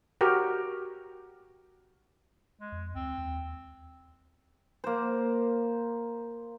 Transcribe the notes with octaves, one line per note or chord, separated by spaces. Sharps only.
F#4 G4 A#4
G#3
F2
D2 C4
D#2
A#3 C5